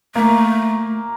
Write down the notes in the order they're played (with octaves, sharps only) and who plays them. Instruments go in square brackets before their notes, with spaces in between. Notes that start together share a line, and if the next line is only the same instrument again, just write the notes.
[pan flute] A3 [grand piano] A#3